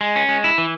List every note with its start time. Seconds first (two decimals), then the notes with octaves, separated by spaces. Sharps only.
0.01 G#3
0.16 C#4
0.29 G#3
0.44 E4
0.58 E3